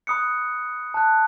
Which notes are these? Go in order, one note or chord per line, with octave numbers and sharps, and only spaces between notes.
B5 D#6 F#6 C#7
A5 D#6 F#6